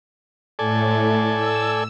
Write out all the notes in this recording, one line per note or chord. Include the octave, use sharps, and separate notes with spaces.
A2 A4 D5 G#5
E6